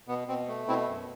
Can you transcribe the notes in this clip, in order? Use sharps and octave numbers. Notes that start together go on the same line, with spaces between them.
B2 B3
B2 C4
A3
B2 C4 E4
F#2